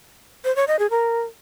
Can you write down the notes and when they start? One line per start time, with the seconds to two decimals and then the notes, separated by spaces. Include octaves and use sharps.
0.45 C5
0.56 C#5
0.68 D#5
0.79 G#4
0.91 A#4